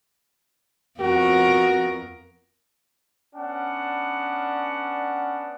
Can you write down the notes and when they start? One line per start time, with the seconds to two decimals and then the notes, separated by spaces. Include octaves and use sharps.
1.00 F2 B3 F#4 A#4
3.36 B3 C#4 D4 F#5